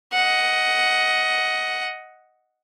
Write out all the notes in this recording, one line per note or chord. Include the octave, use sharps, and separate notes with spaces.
D#5 F#5